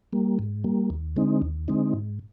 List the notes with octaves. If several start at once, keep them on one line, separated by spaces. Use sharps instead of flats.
G3 A#3
G#2
G3 A#3
D#2
D3 G#3 C4 D#4
D#2
D3 G#3 C4 D#4
G#2